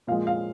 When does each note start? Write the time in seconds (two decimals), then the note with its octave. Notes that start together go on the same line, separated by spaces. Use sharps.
0.07 A#2 F3 G#3 F5
0.27 F5